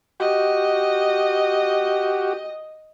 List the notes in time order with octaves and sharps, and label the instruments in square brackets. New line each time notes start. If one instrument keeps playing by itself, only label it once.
[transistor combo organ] F#4 G4 [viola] D#5